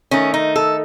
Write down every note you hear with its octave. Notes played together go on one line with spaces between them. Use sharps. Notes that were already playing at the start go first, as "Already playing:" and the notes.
D#3 A3 C#4
D#4
A4